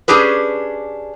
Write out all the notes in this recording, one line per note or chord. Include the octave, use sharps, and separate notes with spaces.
C#4 D4 G4 G#4 B4